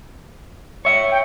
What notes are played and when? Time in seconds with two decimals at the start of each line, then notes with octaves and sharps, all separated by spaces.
0.85 C#5 E5 C#7
1.11 G5